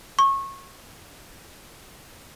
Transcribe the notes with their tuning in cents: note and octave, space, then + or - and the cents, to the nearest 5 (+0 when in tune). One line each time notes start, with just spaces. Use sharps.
C#6 -25